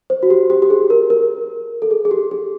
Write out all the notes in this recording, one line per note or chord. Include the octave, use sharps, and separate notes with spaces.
C5
F#4
G4
G4
G4
G#4
A#4
A#4
A4
G#4
G#4
G4
G#4